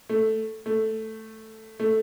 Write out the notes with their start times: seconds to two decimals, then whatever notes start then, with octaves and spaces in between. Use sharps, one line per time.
0.09 A3
0.66 A3
1.80 A3